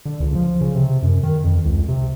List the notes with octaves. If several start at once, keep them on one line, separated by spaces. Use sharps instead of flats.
D3
C#2
F3
C#3
C3
F#2
D#3
F2
C#2
C3